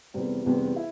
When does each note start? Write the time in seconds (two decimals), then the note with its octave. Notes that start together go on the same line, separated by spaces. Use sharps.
0.14 F1 E2 C3 G3 C4
0.45 F1 E2 C3 G3 C4
0.76 E4